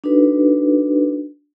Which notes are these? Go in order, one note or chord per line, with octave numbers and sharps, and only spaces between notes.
D4 D#4 F#4 A4 B4